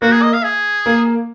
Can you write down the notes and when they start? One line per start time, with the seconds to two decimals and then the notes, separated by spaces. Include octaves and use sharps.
0.02 A#3 F#4
0.12 G#4
0.22 D#5
0.33 F5
0.44 G#4
0.86 A#3